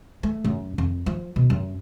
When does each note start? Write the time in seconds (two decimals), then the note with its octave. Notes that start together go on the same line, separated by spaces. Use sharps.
0.23 A3
0.44 F#2
0.78 F2
1.06 F3
1.36 B2
1.50 F#2